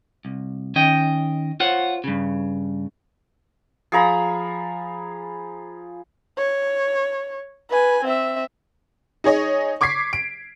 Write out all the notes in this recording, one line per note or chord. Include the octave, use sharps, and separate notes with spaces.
C2
D#3 C#4 D#5 G5
F4 C5 C#5 F#5
G2 C#3
F3 G#4 A#5 B5
C#5
B4 G#5
C4 E5
D#4 G#4 C#5 D#5
C#6 D6 G#6 B6 C7
D7